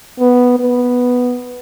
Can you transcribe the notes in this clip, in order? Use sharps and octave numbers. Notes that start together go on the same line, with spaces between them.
B3
B3